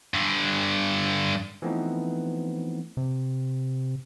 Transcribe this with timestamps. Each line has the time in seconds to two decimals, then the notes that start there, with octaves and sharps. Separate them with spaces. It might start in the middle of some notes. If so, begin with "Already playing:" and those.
0.14 G2 D3
1.62 E3 F3 A3 B3 C4 D#4
2.97 C3